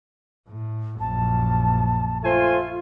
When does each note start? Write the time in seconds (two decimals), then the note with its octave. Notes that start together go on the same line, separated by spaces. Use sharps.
0.48 A2
1.00 A#1 F#2 A5
2.24 A3 F4 C5 G#5